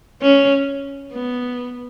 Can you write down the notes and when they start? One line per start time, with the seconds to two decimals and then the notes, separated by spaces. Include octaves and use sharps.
0.22 C#4
1.12 B3